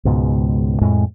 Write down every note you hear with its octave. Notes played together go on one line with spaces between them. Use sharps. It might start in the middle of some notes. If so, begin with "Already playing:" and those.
C#2 G#2 B2
F2 A2 G#3